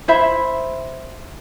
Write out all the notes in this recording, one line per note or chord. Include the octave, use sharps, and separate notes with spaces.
E4 C5 E5 B5